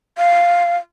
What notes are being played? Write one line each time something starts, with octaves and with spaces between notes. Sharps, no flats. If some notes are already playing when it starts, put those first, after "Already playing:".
F5